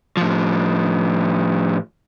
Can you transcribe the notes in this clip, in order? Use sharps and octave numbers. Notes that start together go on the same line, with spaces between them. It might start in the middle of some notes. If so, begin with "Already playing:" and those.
A2 F3